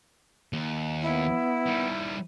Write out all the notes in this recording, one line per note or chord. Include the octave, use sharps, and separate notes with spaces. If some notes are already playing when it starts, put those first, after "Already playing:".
D#2
B3 E4
D#3 G3